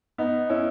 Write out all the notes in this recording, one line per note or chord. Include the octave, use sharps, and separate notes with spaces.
B3 D#4
C#4 E4